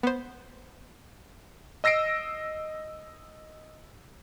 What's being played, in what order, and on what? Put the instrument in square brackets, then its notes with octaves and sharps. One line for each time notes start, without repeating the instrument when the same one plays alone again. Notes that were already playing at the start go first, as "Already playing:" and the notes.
[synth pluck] B3 C5
[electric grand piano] D#5 E6 A#6 C7 D7